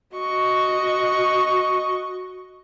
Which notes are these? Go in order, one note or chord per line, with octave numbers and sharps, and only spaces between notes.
F#4 D#5 C#6